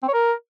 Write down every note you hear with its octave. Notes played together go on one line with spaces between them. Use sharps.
C4
C#5
A#4